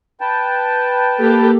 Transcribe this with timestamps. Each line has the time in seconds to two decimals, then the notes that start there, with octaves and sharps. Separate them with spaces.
0.21 B4 G5 A5
1.19 A#3 G4 A4